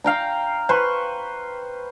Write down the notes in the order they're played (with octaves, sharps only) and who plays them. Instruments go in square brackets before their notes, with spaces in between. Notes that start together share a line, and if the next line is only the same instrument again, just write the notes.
[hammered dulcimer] F5 G5 A#5
B4 C5 C#6